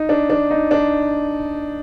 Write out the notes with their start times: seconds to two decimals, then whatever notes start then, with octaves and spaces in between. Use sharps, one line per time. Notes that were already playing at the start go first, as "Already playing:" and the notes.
Already playing: D#4
0.09 D4
0.30 D4
0.51 D#4
0.71 D4